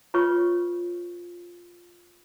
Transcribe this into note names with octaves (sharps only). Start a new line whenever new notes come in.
F4 B4 C#5 C#6